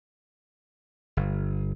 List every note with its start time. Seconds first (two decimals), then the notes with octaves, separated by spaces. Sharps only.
1.17 G1